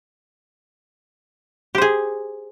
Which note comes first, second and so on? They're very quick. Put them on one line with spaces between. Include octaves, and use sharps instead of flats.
G4 C5 G#4